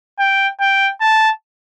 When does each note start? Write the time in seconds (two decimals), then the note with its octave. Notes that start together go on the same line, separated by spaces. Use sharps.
0.19 G5
0.60 G5
1.01 A5